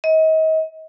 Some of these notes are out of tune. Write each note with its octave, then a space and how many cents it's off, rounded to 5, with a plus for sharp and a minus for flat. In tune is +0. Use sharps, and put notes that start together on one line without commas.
D#5 +35